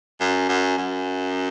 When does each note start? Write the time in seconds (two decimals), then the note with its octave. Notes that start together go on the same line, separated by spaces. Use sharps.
0.21 F#2
0.49 F#2
0.78 F#2